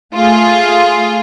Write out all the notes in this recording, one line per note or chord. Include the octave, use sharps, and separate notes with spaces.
A3 F4 G#4